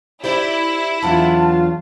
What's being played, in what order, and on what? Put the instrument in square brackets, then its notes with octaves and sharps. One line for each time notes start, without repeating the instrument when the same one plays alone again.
[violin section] E4 [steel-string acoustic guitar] G4 C5 D5
[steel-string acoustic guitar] E2 F#3 D4 [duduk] F4 [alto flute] A5